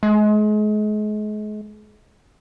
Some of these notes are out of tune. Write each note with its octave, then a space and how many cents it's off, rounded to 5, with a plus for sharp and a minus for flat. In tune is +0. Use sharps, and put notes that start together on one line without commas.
G#3 +35